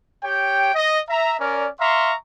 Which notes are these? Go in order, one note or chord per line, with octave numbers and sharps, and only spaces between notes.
G4 C#5 G5
D#5
E5 A#5
C#4 A#4 D5
E5 F5 A#5 C6 C#6